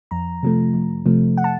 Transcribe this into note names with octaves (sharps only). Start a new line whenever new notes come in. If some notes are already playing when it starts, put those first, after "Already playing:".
F2 A#5
C3 F3 A3
F2
C3 F3 A3
F#5
A5